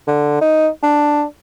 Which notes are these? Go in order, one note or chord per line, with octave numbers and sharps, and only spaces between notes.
D3
D#4
D4